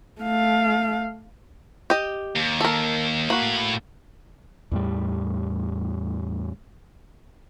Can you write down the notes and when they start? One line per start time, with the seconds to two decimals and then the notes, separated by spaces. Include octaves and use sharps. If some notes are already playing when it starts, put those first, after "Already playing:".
0.21 A3 F5
1.90 G4 D#5
2.36 D#2
2.61 A4 A#4
3.30 A2 A#3 F#4 B5
4.72 E2 A2 G3